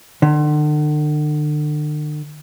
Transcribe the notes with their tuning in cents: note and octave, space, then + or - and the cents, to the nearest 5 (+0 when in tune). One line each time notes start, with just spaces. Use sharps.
D3 +40